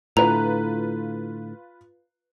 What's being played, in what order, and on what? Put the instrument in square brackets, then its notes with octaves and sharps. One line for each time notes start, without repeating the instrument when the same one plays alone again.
[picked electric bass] A2 D3 [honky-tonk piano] F4 B4 [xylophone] A#5